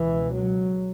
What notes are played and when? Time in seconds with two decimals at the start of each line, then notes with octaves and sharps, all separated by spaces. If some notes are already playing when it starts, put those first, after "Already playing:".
Already playing: C#2 B2 E3
0.34 F#3